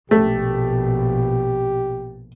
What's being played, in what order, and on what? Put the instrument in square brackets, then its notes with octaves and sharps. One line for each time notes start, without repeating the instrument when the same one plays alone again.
[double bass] A#1 B2 [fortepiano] A3 [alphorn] G4